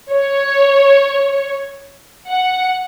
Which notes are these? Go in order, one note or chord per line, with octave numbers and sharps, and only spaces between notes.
C#5
F#5